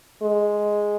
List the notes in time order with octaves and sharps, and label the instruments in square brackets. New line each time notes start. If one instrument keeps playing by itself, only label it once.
[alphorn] G#3